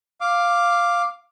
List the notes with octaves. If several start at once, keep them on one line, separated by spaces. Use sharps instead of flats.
F5 D6